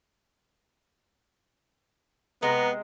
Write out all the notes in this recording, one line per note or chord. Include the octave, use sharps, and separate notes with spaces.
C3 G#3 B3 A#5